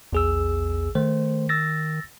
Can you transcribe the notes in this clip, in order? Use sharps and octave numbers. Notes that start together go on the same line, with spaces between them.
A#1 E2 G#4 E6
D#3 A3 C5
E6 A6 A#6